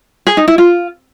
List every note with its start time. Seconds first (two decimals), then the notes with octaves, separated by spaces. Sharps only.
0.27 G#4
0.37 D#4
0.48 E4
0.58 F4